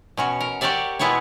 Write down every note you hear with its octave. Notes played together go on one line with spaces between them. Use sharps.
B2 C#4 F#4
A#4
F#4 G4 A#4 C#5 D5 E5
B2 G#3 B3 E4 F#4 C#5